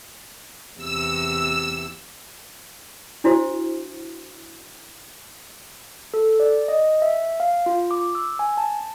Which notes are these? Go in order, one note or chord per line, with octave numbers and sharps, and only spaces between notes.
E2 C3 E6
D4 E4 F#4 C5
A4
D5
D#5
E5
F5
F4
D6
E6
G#5
A5